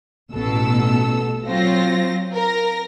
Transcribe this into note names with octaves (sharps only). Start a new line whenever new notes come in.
A1 B2 A4 E6
F#3 C4 F4 A#6
A#4 A#6